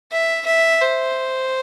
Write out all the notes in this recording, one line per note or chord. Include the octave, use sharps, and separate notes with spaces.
E5
E5
C5